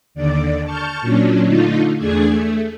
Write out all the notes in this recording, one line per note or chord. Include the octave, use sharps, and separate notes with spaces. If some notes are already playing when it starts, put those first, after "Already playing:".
D#2 D3 D5
A5 C#6 F6 G6
A#2 F#3 C#4 D4
D3 A3 D#4 F4
E2 A3 D4 G#4 G#6
A3